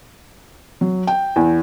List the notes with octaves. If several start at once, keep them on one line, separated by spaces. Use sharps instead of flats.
F#3
G5
E2